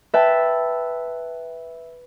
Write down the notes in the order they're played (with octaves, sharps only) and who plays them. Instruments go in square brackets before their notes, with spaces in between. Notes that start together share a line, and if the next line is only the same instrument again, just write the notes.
[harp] B4 E5 G5 A5